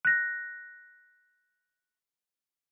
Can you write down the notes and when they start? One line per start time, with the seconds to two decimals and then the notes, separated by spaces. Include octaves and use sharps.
0.05 F#6 A#6